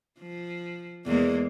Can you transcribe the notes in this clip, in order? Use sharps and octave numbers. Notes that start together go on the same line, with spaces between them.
F3
E2 G#3 A#3